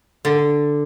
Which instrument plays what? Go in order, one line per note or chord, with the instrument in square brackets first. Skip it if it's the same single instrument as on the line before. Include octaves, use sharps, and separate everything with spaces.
[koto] D3